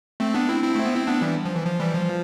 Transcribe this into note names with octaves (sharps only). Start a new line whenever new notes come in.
A3 C4
B3 D4
C4 E4
C4 E4
A3
B3
C4
B3 D4
E3 G3
F3
E3
F3
E3 G3
F3